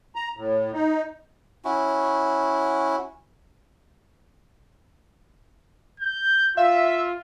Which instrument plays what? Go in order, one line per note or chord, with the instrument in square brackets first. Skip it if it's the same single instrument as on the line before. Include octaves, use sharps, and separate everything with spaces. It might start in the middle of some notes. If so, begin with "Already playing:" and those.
[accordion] A#5
A2
D#4
[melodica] C#4 E4 F#4
[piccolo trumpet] G6
[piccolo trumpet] F4 [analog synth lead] E5 [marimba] F5